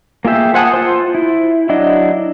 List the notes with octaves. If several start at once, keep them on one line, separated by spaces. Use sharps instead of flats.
A#3 F4 G#4 E5 G5
C5 F#5 G#5 A5 D#6
F4 C5
E4
F#3 D4 E4 D#5